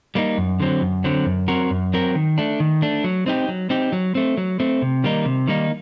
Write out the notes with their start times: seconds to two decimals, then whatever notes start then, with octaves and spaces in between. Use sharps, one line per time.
0.15 G3 A#3 D#4
0.38 F#2
0.59 D3 F#3 C4
0.81 F#2
1.04 D3 F#3 C4
1.26 F#2
1.48 F#3 C4 F#4 A#4
1.70 F#2
1.93 F#3 C4 F#4 A#4
2.15 D#3
2.38 A3 D4
2.60 D#3
2.82 A3 D4
3.04 F#3
3.26 C4 D#4 G4
3.48 F#3
3.70 C4 D#4 G4
3.93 F#3
4.15 A3 C4
4.37 F#3
4.60 A3 C4
4.82 C3
5.04 D#3 G3 A#3 D#4
5.25 C3
5.48 D#3 G3 A#3 D#4